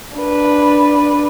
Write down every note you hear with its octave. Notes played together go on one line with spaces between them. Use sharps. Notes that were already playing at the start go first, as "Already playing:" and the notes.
D4 B4